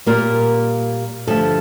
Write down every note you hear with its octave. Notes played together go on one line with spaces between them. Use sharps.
A#2 G3 A#3 A#4
G2 D3 F3 A3 A4